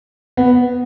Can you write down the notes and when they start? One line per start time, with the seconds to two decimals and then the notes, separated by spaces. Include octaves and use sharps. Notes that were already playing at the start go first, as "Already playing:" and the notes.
0.37 B3